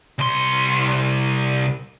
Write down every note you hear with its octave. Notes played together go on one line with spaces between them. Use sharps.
C2 C6